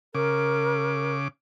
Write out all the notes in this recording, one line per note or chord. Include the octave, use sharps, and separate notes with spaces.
C#3 A#4 D6